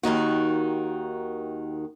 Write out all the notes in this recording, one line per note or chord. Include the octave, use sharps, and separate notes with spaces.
D#2 D#3 D#4 F#4